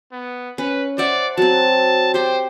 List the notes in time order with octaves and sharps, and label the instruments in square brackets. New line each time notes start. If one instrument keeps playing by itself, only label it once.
[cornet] B3
[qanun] C#4 [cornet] B4
[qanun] C5 E5 F#5 [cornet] D5
[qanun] F#3 C4 [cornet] A5
[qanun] G4 G5 [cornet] C5